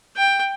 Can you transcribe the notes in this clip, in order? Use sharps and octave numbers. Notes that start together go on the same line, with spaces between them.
G5